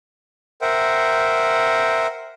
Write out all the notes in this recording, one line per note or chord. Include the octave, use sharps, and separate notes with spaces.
A#4 C5 E5 F#5 G5